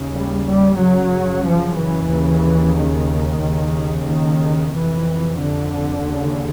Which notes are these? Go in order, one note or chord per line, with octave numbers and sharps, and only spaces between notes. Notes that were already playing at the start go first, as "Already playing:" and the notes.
Already playing: D#2 C#3
G3
G3
F#2 C#3 F#3
F3
E3
D#2 C#3
D#3
D#2 C#3
D#3
F2 C3 E3
D3
D#2 C#3